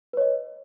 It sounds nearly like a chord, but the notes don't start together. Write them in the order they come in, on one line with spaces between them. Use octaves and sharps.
B4 C#5 D#5